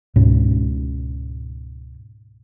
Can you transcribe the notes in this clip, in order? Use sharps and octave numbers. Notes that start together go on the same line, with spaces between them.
C#2 G#2 B2 C#4